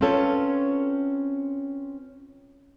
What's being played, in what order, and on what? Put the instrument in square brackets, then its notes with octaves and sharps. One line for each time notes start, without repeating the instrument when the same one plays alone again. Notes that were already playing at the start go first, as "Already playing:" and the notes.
[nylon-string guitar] C4 C#4 F4 A4 B4 C#5